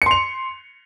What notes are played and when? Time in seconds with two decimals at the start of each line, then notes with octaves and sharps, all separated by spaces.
0.02 C#7
0.06 C6
0.11 F7